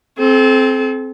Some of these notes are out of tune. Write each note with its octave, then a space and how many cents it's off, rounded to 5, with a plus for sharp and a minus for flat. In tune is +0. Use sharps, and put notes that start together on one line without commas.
C4 +0 A4 -40